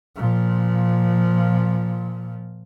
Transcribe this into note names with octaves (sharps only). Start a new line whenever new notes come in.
A#2 F3